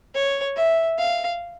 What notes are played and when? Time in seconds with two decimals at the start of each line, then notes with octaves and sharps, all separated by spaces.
0.15 C#5
0.57 E5
0.98 F5